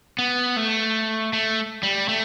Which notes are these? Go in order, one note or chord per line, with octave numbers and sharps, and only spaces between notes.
B3
A3
A3
G3
A3